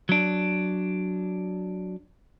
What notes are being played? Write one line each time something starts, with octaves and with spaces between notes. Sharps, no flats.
F#3 D4